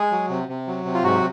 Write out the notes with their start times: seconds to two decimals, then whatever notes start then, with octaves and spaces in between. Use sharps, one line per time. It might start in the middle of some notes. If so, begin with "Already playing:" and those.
Already playing: G#3 G#4
0.12 F#3
0.29 C3
0.49 C3
0.67 F#3
0.85 C3
0.94 F4
1.04 G#2 F#3 F#4